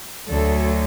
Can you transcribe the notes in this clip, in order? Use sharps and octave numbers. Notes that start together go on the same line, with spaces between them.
D2 D3 F#3 A4